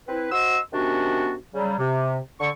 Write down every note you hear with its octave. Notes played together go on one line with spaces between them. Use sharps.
C4 E4 B4
F#4 C5 D#5 C6 E6
C3 D#3 B3 C#4 D4 F#4
C#3 F#3 G3
C3
D3 C#6